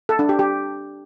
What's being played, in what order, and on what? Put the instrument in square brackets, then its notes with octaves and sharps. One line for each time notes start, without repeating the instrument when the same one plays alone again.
[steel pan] A4
D4
G4
G4